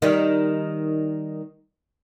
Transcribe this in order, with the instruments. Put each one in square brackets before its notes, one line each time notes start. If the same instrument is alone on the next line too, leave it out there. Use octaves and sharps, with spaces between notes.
[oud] D#3 G3